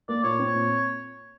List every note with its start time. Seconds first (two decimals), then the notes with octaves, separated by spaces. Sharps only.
0.09 A#3 D5
0.24 A#2 C#5
0.39 C4
0.55 A#2